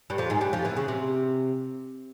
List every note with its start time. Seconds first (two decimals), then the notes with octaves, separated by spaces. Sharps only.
0.10 G2 G3
0.18 F2 F3
0.30 G#2 G#3
0.41 G2 G3
0.53 F2 F3
0.65 E2 E3
0.77 C#3
0.88 C3